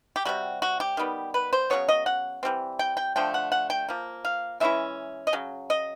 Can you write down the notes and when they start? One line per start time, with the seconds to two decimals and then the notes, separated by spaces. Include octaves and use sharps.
0.16 G4
0.25 C3 D#3 G3 F#4
0.62 F#4
0.80 G4
0.97 D#3 G3 B3
1.34 B4
1.53 C5
1.70 C#3 F#3 B3 C#5
1.89 D#5
2.06 F#5
2.43 E3 G3 C4
2.79 G5
2.97 G5
3.16 D3 F3 A3 G5
3.34 F#5
3.52 F#5
3.70 G5
3.89 F3 A#3
4.25 F5
4.60 E3 G#3 C#4 E4 E5
5.27 D#5
5.33 C#3 F#3
5.70 D#5